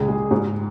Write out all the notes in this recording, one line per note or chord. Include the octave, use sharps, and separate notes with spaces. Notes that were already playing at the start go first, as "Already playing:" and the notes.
Already playing: C#2 A#2 G#4
G#3
G#2